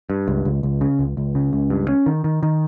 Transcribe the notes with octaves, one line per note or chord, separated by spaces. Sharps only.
G2
C#2
C#2
C#2
C#3
C#2
C#2
C#3
C#2
G2
C#4
D#3
D#3
D#3